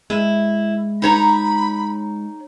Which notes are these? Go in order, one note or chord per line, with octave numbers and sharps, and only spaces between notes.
G#3 E4
D#4 C#5 A#5 B5